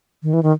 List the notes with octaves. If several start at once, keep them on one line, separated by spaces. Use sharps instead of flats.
D#3
E3
D#3